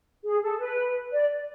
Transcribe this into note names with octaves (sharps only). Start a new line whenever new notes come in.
G#4
A4
B4
D5